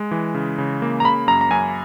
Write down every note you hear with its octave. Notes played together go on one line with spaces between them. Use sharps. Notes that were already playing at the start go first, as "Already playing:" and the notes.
Already playing: G#3
E3
C#3
C#3
A#3
A#5
C#3 B5
F#2 A#5
A#5
F#2 G#5